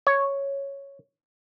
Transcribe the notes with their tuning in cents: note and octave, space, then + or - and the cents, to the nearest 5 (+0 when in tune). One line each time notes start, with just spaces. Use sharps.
C#5 +0